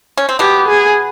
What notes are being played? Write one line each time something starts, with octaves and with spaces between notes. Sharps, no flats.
C#4
C4
B2 B3 G4
G#4